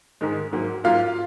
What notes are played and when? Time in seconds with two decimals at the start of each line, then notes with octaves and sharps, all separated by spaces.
0.21 G#2 D#3 G#3
0.53 G#2 F#3 A#3
0.84 G#2 F#3 A#3 F4 F5